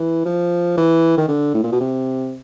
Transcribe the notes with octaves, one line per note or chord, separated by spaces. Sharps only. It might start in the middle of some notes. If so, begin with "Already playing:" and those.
Already playing: E3
F3
E3
D#3
D3
A2
A#2
B2
C3